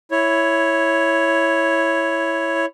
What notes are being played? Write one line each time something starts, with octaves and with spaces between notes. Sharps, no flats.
E4 C#5